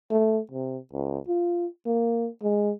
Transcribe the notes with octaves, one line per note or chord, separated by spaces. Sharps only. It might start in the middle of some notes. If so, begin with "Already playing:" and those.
A3
C3
C#2
F4
A#3
G#3